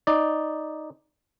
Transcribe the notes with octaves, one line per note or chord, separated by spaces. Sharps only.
D#4 D5